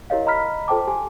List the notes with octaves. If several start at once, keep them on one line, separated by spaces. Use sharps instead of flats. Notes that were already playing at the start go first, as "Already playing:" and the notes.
E4 G4 A#4 C#5 D#5 F5
D#5 A#5 B5 F6 B6
F4 A4 C5 G5 A5 D6
G4 G#5